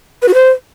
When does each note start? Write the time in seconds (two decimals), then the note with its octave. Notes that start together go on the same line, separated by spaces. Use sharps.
0.22 B4
0.28 F#4
0.34 C5